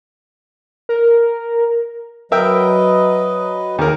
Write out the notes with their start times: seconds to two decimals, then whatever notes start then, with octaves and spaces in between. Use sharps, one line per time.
0.89 A#4
2.32 F#3 A#4 B4 D#5 E5 G5
3.78 D#2 G#4 A#4